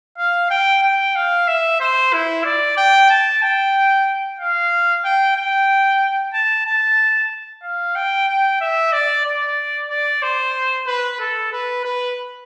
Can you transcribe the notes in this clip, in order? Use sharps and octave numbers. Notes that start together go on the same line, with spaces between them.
F5
G5
G5
F5
E5
C5
E4
D5
G5
A5
G5
F5
G5
G5
A5
A5
F5
G5
G5
E5
D5
D5
D5
C5
B4
A4
B4
B4